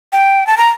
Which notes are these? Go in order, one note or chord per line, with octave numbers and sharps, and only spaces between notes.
G5
A5
A#5